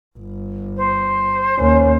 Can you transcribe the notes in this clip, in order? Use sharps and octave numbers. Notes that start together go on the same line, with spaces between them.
G1
C5
D#2 C#4